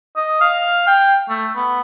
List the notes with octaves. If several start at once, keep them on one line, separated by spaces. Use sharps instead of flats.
D#5
F5
G5
A3
B3